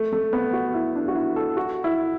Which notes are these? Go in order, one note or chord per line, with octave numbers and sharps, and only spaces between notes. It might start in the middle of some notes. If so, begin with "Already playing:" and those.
Already playing: A3
A3
B3
F#4
E4
D4
F#4
E4
A4
F#4
E4